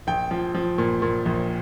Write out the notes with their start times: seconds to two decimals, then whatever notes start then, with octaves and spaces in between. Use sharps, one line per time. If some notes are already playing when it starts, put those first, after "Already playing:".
0.07 A#1 G5
0.31 F3
0.54 F3
0.78 A#2
1.02 A#2
1.26 A#1